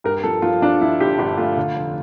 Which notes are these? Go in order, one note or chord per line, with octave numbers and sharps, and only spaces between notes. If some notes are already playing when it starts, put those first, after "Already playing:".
G2 A#4
F3 A4
F3 F4
F3 D4
F3 E4
G1 G4
G1 G4
A3 F4
D3
F1